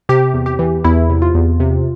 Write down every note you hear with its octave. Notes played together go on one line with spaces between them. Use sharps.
C3 G4
E2
G4
E3
E2 E4
C3
F4
E2
C3